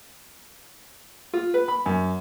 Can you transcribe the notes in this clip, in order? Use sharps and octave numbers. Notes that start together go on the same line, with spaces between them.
F4
B4
B5
F#2